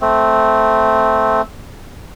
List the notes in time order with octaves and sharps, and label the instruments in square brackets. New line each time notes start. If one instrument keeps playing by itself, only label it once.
[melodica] A3 C4